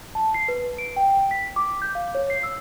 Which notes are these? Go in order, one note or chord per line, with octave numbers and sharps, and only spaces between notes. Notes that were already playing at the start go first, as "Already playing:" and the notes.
A5
C7
B4
D7
G5
B6
D6
G6
F5
C#5
C7
E6